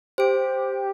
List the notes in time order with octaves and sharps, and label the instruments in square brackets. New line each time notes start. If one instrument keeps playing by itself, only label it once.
[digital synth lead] G4 [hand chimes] C5 D7